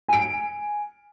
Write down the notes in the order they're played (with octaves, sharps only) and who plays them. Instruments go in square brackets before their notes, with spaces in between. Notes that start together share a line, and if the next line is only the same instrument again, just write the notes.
[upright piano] G#5 D7